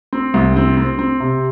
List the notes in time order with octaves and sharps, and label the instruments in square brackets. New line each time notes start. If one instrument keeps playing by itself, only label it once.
[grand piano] C4
C2
C4
C4
C4
C3